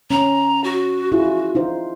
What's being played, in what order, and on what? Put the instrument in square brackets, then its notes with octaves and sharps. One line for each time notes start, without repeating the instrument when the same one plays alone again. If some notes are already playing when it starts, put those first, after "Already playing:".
[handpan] C#4 [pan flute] A#5
[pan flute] F#4
[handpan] E4 F4 G#4
D#4 F4 C5